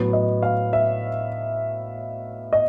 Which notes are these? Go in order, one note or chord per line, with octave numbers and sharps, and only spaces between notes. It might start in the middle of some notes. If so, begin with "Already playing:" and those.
Already playing: A2 F#3 B3
D#5
F5
E5
D#5